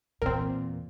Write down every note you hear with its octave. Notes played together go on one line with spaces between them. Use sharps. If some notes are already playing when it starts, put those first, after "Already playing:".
E2 A#2 C4 A#4